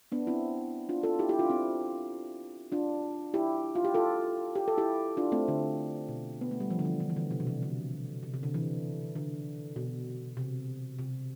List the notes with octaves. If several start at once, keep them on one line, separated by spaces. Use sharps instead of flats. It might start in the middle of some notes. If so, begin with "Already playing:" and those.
B3 D4
C4 E4
D4 F4
F4 A4
E4 G4
E4 G4
D4 F4
C4 E4
D4 F4
E4 G4
F4
G4
F4 A4
G4
A4
E4 G4
D4 F4
A3 C4
D3
B2
B3
A3
G3
F3
D3
E3
D3
E3
D3
C3
B2
C3
D3
C3
C3
D3
E3
D3
B2
C3
C3